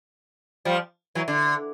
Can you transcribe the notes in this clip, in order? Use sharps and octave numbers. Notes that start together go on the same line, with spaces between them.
F3 G3
E3 F#3
D3